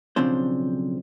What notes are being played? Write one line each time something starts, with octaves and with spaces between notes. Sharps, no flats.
B1 C#3 F3 C4 D4 C5